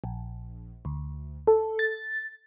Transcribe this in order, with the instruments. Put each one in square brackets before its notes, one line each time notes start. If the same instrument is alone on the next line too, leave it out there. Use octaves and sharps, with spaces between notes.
[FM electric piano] A#1
D2
A4
A6